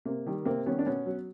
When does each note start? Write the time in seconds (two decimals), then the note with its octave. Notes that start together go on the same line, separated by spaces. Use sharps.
0.05 C3 A#3
0.26 D#3 G3
0.45 C3 A#3 C4
0.66 D#3 G3 B3 C#4
0.79 D4
0.86 B2 B3 C#4
1.06 F#3